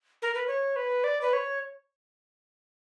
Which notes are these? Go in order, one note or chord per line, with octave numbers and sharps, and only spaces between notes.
A#4
B4
C#5
B4
D5
B4
C#5